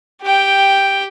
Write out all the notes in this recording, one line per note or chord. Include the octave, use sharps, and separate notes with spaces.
G4 G5